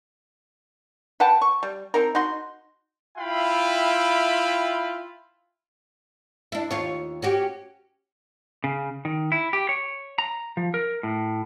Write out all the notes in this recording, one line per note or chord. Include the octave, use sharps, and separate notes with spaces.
B4 F#5 G5 A5
C#6
G3
C4 D#4 A#4
D#4 F#4 C6
E4 F4 E5 F5 G5 B5
D4 E4
D#2 F4 C#5
C#4 F#4 G4
C#3
D#3
E4
G4
C#5
A#5
F3
A#4
A2